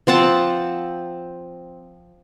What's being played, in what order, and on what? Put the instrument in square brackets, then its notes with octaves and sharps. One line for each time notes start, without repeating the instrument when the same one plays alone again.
[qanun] F3 C4 F#5 A5